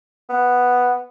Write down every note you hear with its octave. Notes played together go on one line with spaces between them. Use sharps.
B3